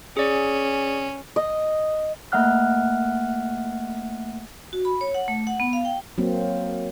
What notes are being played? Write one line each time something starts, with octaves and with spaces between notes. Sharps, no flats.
C#4 G#4 D5
D#5
A3 A#3 E5 F#5 F6 F#6
F#4
B5
C#5
F#5
A3
F#5
B3
F5
G5
F#3 A#3 C4